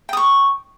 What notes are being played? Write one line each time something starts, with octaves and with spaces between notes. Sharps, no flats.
G5 C#6 D#6